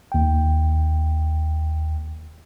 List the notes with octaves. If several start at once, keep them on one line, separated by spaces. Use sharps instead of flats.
D#2 G5